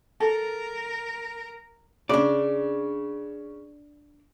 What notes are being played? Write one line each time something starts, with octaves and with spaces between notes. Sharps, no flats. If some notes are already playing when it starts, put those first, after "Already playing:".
A4 A#4
C#3 D4 D5